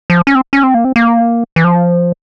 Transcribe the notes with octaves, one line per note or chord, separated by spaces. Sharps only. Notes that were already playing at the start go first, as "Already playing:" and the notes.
F3
C#4
C4
C#4
C4
A#3
C4
A#3
E3
F3